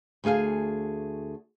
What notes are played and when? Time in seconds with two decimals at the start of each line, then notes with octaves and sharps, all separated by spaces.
0.24 D2 A3 G#4 F5 G#5